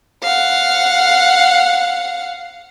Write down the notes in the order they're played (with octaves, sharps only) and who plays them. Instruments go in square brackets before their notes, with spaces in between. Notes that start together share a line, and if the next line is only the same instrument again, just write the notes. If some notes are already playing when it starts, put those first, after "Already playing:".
[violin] F5 F#5